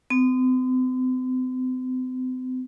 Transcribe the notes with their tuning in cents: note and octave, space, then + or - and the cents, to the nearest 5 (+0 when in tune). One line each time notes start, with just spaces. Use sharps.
C4 -40